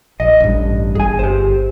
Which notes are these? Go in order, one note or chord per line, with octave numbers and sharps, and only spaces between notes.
A#1 D#5
A1 G2
G1 G#4 G#5
G4 C5